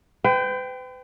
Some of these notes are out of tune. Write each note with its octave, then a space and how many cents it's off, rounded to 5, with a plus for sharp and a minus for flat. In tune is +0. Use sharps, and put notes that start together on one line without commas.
B4 +45 G5 +0